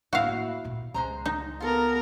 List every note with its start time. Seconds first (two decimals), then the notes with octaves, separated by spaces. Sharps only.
0.13 A2 A#3 E4 F#4 F5
0.64 A1 A#2
0.94 C#2 G#3 C5 A#5
1.26 D#4
1.60 B3 F4 A4 A#4